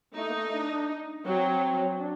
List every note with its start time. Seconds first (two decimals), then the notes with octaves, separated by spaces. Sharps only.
0.15 A3 D#4
0.29 A#3
0.34 A3
0.52 D4
0.70 D4
1.25 F#3 C4
1.89 C4
1.98 D4